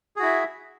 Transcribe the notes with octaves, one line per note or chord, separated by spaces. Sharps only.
E4 F#4 G#4 E5